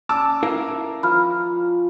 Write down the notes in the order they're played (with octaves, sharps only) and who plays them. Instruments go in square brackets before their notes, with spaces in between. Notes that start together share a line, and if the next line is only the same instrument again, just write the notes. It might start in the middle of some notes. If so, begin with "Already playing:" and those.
[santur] C#4 D5 [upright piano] A5 D6 E6
[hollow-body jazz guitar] E4 A#4 F5
[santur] F3 A#5 [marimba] B5 F6